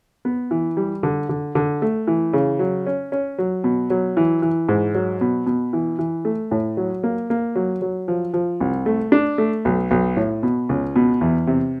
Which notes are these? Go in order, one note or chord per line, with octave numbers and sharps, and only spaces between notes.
B3
E3
G3
D3
D3
D3
A3
E3
C#3
F#3
C#4
C#4
F#3
B2
F#3
E3
E3
G#2
F#3
B2
B2
E3
E3
A3
A2
F#3
A#3
A#3
F#3
F#3
F3
F3
C2
A3
D4
A3
B1
B1
A2
B2
C#2
B2
E2
C3